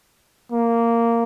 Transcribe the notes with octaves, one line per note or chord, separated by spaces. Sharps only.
A#3